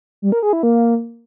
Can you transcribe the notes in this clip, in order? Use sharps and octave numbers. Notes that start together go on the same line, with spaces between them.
G3
A#4
G#4
E4
A#3